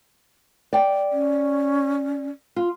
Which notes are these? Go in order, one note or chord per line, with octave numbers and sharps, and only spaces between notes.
D5 G5
C#4
F4